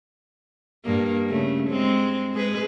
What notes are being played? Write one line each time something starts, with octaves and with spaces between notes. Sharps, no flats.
G2 A#3
C#3 A3
G#3 C4
G#3 G#4 B4